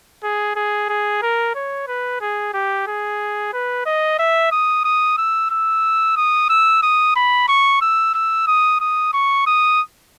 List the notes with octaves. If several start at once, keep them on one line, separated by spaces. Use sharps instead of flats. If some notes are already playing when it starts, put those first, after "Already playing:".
G#4
G#4
G#4
A#4
C#5
B4
G#4
G4
G#4
B4
D#5
E5
D#6
D#6
E6
E6
D#6
E6
D#6
B5
C#6
E6
E6
D#6
D#6
C#6
D#6